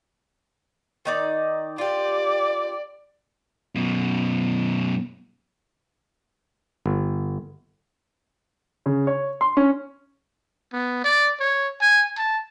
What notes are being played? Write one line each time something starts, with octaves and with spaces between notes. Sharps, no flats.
D#3 D#4 D5
F4 G4 D5
F#2 B2
G1
C#3
C#5
C6
C#4
B3
D5
C#5
G#5
A5